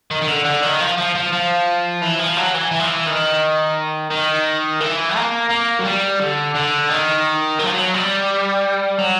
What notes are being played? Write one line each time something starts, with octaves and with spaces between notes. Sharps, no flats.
D#3
D#3
D3
D3
D#3
F3
F3
F3
F3
E3
F3
F#3
E3
E3
F3
E3
D#3
D#3
E3
A#3
A#3
F#3
G3
D3
D3
D#3
F#3
F3
F#3
G3
F#3